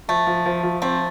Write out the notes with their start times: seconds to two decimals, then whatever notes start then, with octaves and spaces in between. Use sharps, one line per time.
0.08 F3 A3
0.27 F3
0.46 F3
0.63 F3
0.82 A3 C4